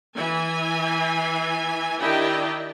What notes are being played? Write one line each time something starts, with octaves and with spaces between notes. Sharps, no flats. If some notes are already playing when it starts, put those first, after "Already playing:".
E3 G#5
D#3 D4 E4 G4 D#5 G5